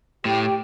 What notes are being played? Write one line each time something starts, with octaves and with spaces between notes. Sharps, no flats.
A2 G4 G5